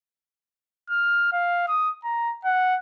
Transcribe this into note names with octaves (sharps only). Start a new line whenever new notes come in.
F6
F5
D#6
A#5
F#5